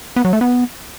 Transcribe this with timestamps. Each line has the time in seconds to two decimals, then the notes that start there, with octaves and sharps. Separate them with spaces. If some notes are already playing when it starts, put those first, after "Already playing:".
0.16 B3
0.25 F#3
0.33 A3
0.41 B3